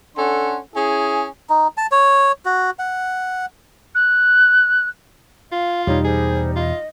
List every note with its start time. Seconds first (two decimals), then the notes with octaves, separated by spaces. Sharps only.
0.16 C#4 D4 A4 F#5 C6
0.75 C#4 E4 G#4
1.49 D#4
1.77 A5
1.92 C#5
2.45 F#4
2.79 F#5
3.95 F#6
5.52 F4 F5
5.87 E2 B2 E3 G3 D#4 C#5
6.04 G#4 C5
6.56 F4 D#5